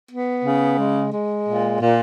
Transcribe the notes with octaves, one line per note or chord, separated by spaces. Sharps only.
B3
C#3
G#3
G#3
A#2
A#2